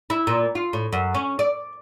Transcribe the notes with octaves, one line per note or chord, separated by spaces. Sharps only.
E4
A#2
F4
A2
F#2
C#4
D5